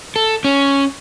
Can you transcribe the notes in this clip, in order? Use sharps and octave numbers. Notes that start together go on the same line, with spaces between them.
A4
C#4